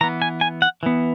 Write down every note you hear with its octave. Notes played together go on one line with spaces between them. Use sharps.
E3 B3 A#5
G#5
G#5
F#5
E3 B3